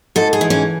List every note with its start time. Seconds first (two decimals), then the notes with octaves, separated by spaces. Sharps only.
0.16 G#2 A4
0.33 G#4
0.41 E3
0.50 C#4